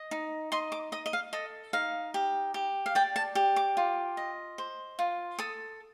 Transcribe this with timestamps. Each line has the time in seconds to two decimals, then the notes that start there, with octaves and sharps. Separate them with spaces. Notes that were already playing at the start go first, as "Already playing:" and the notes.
Already playing: D#5
0.11 D#4
0.52 D#5 C6
0.72 D6
0.92 D#5 D#6
1.06 D#5
1.13 F5
1.33 A4 D#5
1.73 D#4 F5
2.14 G4
2.54 G4
2.86 F5
2.95 D5 G5
3.16 A5
3.35 G4
3.56 D6
3.77 F4
4.17 D#5
4.58 C5
4.99 F4
5.39 A4 D#6